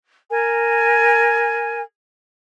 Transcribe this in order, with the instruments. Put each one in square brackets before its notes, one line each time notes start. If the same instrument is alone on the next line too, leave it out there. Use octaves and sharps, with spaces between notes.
[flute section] A#4 G#5